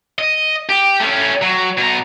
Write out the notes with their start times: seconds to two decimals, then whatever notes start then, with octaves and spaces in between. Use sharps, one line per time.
0.19 D#5
0.69 G4
1.00 A3 C#4
1.42 F#3
1.77 B2 A#5